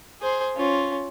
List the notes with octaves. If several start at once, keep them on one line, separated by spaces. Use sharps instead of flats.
G#4 C5
C#4 F4